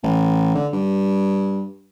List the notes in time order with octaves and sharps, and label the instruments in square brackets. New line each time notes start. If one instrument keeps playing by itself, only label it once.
[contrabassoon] A1
D3
G2